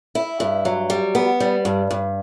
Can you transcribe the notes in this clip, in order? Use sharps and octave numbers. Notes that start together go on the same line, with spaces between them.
E4
G2
F#3
G3
B3
G3
G2
G2